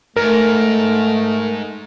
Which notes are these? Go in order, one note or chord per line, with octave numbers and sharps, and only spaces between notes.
G#2 A3 A#4